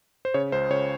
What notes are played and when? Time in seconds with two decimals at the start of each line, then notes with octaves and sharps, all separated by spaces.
0.25 C5
0.34 C#3 C#5
0.52 C#2 C5
0.70 C#2 C#5